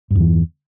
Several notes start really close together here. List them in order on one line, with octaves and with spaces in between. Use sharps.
G2 E2 E3